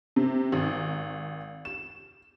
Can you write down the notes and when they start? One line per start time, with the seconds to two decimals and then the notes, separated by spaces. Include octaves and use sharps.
0.16 C3
0.52 G#1
1.65 E7